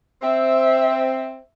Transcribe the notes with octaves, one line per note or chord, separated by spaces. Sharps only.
C4 E5